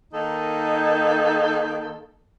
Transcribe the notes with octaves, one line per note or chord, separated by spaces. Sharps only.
D#3 A#3 D#4 A4